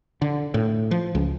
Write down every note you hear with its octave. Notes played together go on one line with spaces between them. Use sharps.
D3
A2
F3
C#2